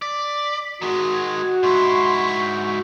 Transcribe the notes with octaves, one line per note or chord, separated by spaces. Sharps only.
D5 B6
D#3 G#3 F#4
G#6
G#2 E4 C6 C#6
G6